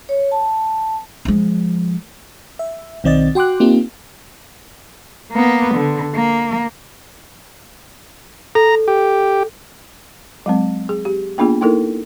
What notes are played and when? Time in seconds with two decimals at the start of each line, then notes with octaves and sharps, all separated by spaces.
0.09 C#5
0.31 A5
1.25 F3 G#3
2.59 E5
3.04 B1 D#3 C4 D5 D#5 A6
3.35 F#4 G5 C6 D6 F#6
3.60 A#3 C4 D#4 F4 G4
5.32 A#3 B3
5.74 D3
6.15 A#3
8.55 A4 A#5
8.88 G4
10.46 F#3 G#3 C4
10.89 G#4
11.05 G4
11.38 A#3 B3 D4 F4 G#4
11.61 A#3 D#4 E4 A4 A#4